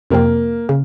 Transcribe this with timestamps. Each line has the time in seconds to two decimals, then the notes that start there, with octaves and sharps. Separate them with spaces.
0.10 F2 C3 F3 A#3 C4
0.69 C#3